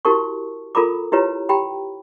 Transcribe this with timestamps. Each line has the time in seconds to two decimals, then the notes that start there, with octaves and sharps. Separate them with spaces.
0.05 E4 F#4 G4 A#4 A5 C#6
0.75 F4 A4 A#4 A#5 B5 D6
1.12 E4 F4 G4 B4 C#5 A#5
1.49 G4 G5 A#5 B5